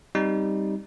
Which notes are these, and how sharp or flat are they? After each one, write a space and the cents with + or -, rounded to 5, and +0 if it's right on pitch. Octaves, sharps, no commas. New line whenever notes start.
G3 +0 C4 +0 D#4 +0